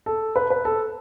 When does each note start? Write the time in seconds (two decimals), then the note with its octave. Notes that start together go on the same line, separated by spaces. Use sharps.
0.06 A4
0.36 B4
0.50 B4
0.65 A4